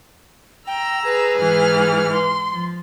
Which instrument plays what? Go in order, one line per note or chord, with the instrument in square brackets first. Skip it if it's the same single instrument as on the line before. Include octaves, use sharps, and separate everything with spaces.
[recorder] G5 [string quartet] A#5 E6
[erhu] G#4 [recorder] B4
[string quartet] G#2 E3 F6
[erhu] C6
[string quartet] F3